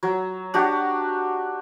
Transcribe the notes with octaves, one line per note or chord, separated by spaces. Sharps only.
F#3
D4 F#4 G4